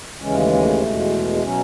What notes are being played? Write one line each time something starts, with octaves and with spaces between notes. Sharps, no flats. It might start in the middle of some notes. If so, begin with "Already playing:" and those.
D#2 C#3 E3 G#3 C#4
A3
A3
E2 B2 G#3
B2 F#3 C#4